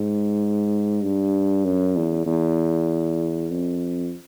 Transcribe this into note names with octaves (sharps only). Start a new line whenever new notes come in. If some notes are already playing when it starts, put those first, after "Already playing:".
Already playing: G#2
G2
F#2
E2
E2
F2